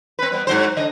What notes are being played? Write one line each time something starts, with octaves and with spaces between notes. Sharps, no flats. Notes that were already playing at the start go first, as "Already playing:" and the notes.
C4 B4
G3 B3 C4
G#2 F#3 C5
D3 D4 D#5